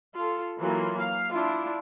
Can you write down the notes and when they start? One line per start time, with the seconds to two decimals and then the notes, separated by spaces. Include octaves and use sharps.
0.14 F4 A4
0.58 E3 F#3 A#3 F4
0.98 F5
1.33 D4 E4 F4